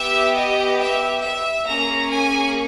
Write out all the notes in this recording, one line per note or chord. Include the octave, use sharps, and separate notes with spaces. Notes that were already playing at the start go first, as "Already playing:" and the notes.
Already playing: B3 G4 E5
D#5
E5
E5
A#3 C#4 G#4 A#5
G#5